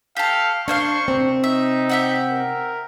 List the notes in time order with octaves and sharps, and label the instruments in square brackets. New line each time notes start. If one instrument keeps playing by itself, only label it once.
[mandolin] G4 A4 [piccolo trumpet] F5
[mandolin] A#3 C5 F5 [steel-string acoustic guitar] D4 [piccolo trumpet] C#6
[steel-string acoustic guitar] C3 C4
[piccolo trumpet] D#4 [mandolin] E5
[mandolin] G4 E5 F#5
[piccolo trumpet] A#4